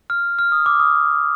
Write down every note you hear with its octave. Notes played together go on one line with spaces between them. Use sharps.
F6
F6
D#6
D6
D#6